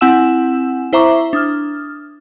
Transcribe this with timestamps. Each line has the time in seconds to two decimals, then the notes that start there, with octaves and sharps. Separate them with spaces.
0.01 C4 E4 F#5 G#5 E6 E7
0.93 E4 C5 E5 A#5 C#6 D6
1.33 D4 D#6 F6